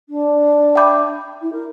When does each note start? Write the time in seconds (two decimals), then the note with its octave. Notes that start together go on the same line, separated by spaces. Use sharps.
0.09 D4
0.75 E5 G5 B5 D6 G6
1.41 E4
1.52 A#4